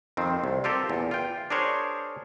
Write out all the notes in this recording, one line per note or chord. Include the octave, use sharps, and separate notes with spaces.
F2 D#3 C4
C2
C4 F4 G4 A4 A#4
E2 A#2
F4 G5
D4 G#4 A#4 C5 C#5